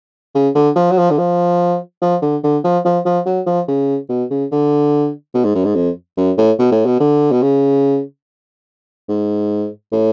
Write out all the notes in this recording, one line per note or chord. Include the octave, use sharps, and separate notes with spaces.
C#3
D3
F3
F#3
F3
D3
F3
F3
D3
D3
F3
F3
F3
F#3
F3
C#3
B2
C#3
D3
B2
G#2
F#2
G#2
F2
F#2
A2
B2
A2
B2
D3
B2
C#3
G#2
A2